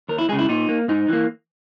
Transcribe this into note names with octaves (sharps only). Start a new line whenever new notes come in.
D#2 A#4
E4
C#3 G#3 G#4
E4
A#2 D#4
A#3
G#2 D#4
E3 A#3